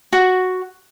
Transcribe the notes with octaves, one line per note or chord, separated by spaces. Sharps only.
F#4